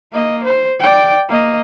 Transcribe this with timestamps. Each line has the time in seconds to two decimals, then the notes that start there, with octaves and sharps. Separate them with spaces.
0.12 A#3 D#5
0.44 C5
0.80 D5 G5
1.28 A#3 D#5